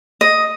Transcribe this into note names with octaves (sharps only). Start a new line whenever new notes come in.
D#5